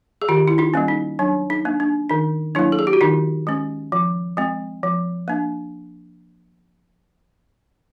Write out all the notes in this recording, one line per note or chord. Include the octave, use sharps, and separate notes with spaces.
G#4
D#3 F4 G4
E4
D#4 F4
G3 A#3 C#4
D#4
F#3 D4
D#4
A#3 D4
D4
D#3 D#4
F#3 A#3 D4 E4
A4
G#4
G4
F#4
D#3 D#4 F4
G#3 C#4
F3
G#3 C4
F3
A#3 D4